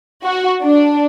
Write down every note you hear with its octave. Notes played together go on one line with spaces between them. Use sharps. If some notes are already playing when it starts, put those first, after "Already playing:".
F#4
D4